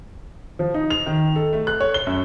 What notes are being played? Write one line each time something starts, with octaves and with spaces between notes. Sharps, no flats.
F3
D#4
F7
D#3
A4
A3
F#6
C#5
G7
F#2